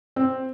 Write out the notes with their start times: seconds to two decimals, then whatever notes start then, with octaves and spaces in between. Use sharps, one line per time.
0.16 C4